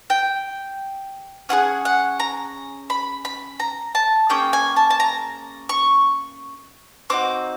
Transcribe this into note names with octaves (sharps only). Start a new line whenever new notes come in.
G5
C#4 F4 G#4 F#5
F#5
A#5
B5
B5
A#5
A5
A#3 C#4 G#4 G5
G#5
A5
A5
A#5
C#6
C4 D#4 F#4 D6